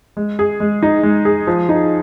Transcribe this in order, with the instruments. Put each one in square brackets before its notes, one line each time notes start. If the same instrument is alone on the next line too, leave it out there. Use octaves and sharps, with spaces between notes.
[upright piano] G#3
G#4
G#3
D#4
G#3
G#4
F3
D#4